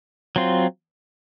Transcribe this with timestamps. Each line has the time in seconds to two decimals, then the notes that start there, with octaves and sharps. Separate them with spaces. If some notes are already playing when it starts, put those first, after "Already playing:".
0.36 F#3 C4 F4